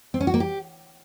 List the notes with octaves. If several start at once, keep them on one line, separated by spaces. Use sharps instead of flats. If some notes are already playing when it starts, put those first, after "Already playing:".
C4
C#4
F#4
A#3
G4